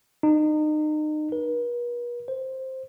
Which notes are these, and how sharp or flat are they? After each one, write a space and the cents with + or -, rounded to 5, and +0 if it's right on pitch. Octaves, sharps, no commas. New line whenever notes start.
D#4 -30
B4 -45
C5 +5